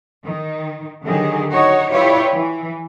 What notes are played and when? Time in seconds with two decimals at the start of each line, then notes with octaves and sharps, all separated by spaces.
0.24 D#3
1.04 D3 D#3 F#3 G4 G#4
1.52 D#4 F#4 C#5
1.90 E4 F4 G4 B4 C#5 D5
2.33 E3